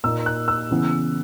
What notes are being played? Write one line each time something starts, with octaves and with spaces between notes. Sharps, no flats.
A#2 A#3 D#4 E6
F#6
E6
C#3 E3 B3